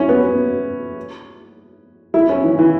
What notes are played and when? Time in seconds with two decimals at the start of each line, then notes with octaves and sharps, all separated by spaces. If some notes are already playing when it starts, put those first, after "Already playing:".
Already playing: C#4 E4
0.09 B3
0.23 B3
2.14 E4
2.29 C#4
2.44 E3
2.59 E3